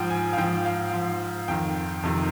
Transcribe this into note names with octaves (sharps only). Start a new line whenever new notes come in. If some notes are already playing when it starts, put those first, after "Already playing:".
Already playing: G#2 F3 G5
G#5
F5
G#2 F3 G5
F5
G#2 F3
F2 D#3 G5
F2 C3 D#3